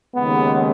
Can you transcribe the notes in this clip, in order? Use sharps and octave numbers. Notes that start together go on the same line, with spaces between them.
D#2 C#3 G#3 B3